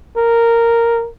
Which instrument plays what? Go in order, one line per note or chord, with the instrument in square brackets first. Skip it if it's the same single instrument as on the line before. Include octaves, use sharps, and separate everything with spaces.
[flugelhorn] A#4